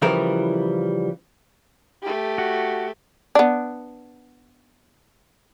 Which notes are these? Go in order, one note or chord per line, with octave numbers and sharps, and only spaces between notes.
C#3 E3 F3 G3 E4 A#4
A3 G4
F#4
B3 D4